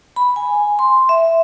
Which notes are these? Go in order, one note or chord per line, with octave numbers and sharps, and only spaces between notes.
B5
G#5
C6
E5